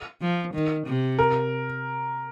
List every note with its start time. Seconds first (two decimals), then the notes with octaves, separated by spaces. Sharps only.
0.21 F3
0.54 D#3
0.87 C3
1.19 A#4